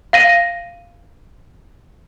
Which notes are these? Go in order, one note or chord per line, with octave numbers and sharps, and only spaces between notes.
F5 A#6 D#7